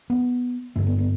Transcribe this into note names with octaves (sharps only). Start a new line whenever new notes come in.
B3
G2 D3 A3
B3
B3